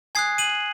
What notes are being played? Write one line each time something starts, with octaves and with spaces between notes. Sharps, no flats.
G#5 D#6 F#6 G#6 C7
D#7 F#7